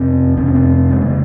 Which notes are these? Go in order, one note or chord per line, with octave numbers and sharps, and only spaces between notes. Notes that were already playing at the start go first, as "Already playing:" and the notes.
Already playing: F2 C3 C4
F2 C3 C4
C#4
C4
G#3
C#3 A#3